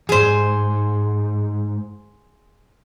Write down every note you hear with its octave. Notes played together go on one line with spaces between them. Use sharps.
E2 G#2 G#4 C5